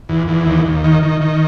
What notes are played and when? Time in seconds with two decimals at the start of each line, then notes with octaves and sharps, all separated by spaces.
0.09 E2
0.28 E2
0.46 D#2
0.65 D#2
0.84 D#3
1.03 D#3
1.21 D#3